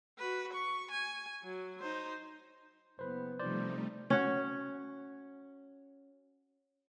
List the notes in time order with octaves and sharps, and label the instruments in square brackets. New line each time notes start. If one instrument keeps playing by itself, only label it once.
[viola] F#4 B4
C#6
G#5
F#3
D#4 C5
[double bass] F#1 B3 [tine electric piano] B4 C5
[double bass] C3 F3 [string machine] G3 A3 D#4 [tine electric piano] C5 D5
[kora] C#4 F#4